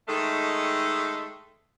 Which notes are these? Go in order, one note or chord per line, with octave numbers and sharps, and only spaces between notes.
D#3 G#3 A3 A4